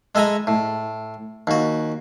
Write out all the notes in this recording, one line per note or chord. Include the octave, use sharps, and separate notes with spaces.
G#3 A4 E5 G#5 A#5 B5
A2
D#2 F#4